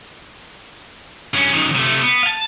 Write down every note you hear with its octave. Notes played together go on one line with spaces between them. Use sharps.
G2 C#4
F#2 D#3
C3 A3
B3
F5 A5